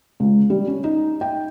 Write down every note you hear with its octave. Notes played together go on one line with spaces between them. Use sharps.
C#2
G3
C#4
D#4
G5